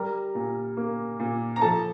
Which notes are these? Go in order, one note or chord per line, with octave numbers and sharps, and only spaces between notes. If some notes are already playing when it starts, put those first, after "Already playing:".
Already playing: G3 A#4 A#5
A#2
A#3
A#2
A#5
F3 A4 A5